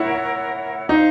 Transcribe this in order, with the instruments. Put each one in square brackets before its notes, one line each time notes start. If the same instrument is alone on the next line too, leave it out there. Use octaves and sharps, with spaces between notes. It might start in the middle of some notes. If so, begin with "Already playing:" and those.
Already playing: [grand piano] E4 [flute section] A#4 C#5 F#5
[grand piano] D#4 [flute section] C5 F5 A#5